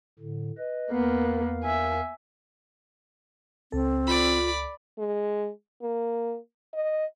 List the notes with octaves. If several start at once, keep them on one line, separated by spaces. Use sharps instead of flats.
A2 D3
B4 D#5
E2 A#3 B3 A#4 F5
E5 G#5
C#2 C4 A4
F4 D5 B5
G#3
A#3
D#5